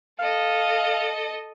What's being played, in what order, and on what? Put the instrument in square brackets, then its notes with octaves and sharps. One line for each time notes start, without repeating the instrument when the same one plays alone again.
[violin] A4 D#5 [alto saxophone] F5